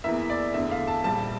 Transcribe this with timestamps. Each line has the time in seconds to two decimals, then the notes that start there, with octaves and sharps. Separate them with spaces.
0.04 E2 E3 A#3 E5
0.30 D5
0.54 E2 D3 A3 E5
0.71 F5
0.87 A5
1.04 A#1 A#2 G3 A5